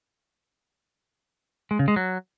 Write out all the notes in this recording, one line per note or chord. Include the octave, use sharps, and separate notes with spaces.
G#3
C#3
G#3
F#3